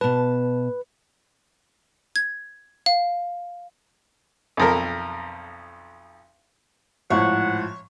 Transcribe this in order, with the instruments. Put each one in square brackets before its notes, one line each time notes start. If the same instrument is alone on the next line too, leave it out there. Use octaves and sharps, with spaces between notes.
[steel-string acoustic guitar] B2 A5 [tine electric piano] B4
[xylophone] G#6
F5
[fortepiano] B1 F2 A#4
[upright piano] G#1 A2 F3 [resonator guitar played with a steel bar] C#5 [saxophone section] F#5